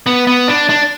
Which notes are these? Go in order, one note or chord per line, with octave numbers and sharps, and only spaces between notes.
B3
B3
D4
D4